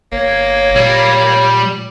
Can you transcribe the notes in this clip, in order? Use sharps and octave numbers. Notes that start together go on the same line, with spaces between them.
G1 A#3 C#5
A#2 G3